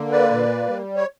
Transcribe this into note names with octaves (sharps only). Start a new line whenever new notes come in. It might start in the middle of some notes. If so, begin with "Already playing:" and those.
Already playing: D3 A#3
B4 D5
A#2
G3
C#5